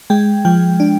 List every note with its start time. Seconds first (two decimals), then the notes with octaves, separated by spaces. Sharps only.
0.10 G#3 G5
0.45 F3 G5
0.80 D4